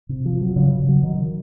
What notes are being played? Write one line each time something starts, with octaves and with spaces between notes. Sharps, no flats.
C3
F3
F#3
C#3
C#3
F#3
D#3